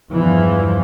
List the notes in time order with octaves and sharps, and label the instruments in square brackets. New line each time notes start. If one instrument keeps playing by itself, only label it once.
[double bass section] E2 G2 E3 F3